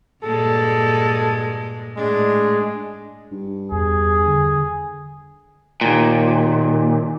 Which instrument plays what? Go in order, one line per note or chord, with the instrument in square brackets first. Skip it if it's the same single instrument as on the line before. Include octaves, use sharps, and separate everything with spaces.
[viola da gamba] G2 A#2 G#3 [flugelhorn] A4
[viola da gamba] A2 D4 [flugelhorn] G#3
[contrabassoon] G2
[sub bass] E2 [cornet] G#4
[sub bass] D3
[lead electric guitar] D#2 A#2